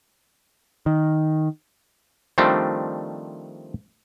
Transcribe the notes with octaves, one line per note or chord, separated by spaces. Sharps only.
D#3
D#3 F3 G3 A3 C4 D4